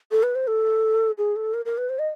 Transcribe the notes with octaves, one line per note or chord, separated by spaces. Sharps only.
A4
B4
C5
A4
G#4
A4
A#4
A#4
B4
C5
D#5